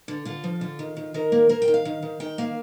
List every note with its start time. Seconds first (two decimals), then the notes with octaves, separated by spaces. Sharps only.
0.08 D3
0.25 D3 F4
0.44 F3
0.61 D3
0.79 D#3
0.97 D#3
1.14 D#3 A#4
1.32 A#3
1.49 A#3 A#4
1.62 G5
1.68 D#3
1.74 F5
1.85 D#3
2.02 D#3
2.20 D#3 G5
2.38 A#3 F5